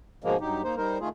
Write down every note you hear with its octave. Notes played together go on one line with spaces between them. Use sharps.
G#2 B2 F3 G#3 A#3
G2 F#3 D#4 G4
A#3 D#4 C5
G3 D#4 A#4 C5
D#3 A3 F4 G#4